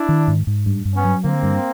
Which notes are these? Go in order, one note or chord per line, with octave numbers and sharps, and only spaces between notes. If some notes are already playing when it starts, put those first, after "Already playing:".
Already playing: D4 E4
D#3
G#2
G#2
G2
G2
B3 C#4
F#3
D3 A#3 C4
G2